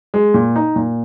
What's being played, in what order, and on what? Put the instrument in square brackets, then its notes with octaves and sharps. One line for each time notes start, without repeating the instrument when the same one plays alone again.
[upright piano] G#3
A#2
D#4
A#2